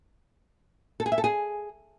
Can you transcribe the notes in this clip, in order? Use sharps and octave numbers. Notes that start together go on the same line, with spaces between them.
A4
G#4
E5
A4
G#4